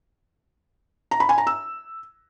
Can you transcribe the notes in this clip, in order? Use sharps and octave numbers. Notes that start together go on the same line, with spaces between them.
A#5
B5
G#5
A#5
E6